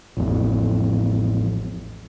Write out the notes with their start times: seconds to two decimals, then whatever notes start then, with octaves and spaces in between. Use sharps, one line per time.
0.17 A1 F2